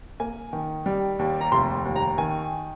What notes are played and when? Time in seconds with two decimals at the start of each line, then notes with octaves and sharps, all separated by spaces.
0.20 A#3 G#5
0.53 D#3
0.86 G3
1.19 D#2
1.41 A#5
1.52 F1 C6
1.85 D#2
1.96 A#5
2.18 D#3 G#5